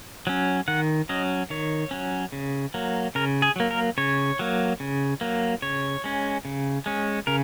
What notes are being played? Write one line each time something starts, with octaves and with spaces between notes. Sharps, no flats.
F#3 C#4
D#3 F#5
F#3 C#4 D#5
D#3 C#5
F#3 C#4
C#3
F#3 A#3
C#3 A#4
G#4
F#3 A#3
A#4
C#3 C#5
F#3 A#3
C#3
F#3 A#3
C#3 C#5
G#3 C#4
C#3
G#3 C#4
C#3 A#4